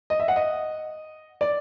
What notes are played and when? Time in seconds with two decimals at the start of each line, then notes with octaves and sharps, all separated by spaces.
0.10 D#5
0.20 E5
0.28 F#5
0.36 D#5
1.41 D5